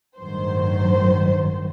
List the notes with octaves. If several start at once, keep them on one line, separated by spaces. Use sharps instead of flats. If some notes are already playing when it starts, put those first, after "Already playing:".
A1 G2 D#3 F#3 C5